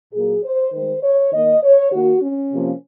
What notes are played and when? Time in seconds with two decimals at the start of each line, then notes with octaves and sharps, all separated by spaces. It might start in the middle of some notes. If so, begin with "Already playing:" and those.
0.14 A#2 F#3 A#3 G#4
0.44 C5
0.73 D#3 G#3 C5
1.03 C#5
1.32 D#3 A#3 D#5
1.62 C#5
1.92 D#3 A#3 F#4
2.22 C#4
2.51 C3 F3 A#3